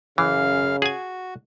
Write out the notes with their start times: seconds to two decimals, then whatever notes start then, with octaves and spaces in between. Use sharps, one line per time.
0.18 F#2 C#3 E3 F5 F6
0.82 F#4 G#4 G#5